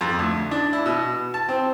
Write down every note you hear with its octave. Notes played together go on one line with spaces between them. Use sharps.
F2
D2
D4
E4
B2
A5
C4